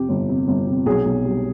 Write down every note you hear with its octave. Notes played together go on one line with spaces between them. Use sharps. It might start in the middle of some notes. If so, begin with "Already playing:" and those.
Already playing: F2 C3 G4
G1
C3
G1
C3
B1 G#4
B1
G3